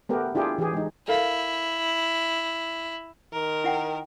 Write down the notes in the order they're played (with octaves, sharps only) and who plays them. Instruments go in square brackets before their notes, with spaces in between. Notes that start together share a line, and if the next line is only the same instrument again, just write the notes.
[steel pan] A3 B3 G4 A#4
D4 E4 F4 G4 G#4
E3 G4 G#4
G#3 D#4
[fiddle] E4 [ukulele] A4 A#4 F5
[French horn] D#3 [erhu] A#4
[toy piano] E4 F#5 G5